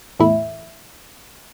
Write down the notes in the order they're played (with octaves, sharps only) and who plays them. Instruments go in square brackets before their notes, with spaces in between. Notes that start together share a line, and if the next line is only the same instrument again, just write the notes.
[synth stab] E2 A2 E4